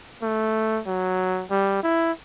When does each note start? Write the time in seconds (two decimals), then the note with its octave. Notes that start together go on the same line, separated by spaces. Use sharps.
0.22 A3
0.86 F#3
1.51 G3
1.83 E4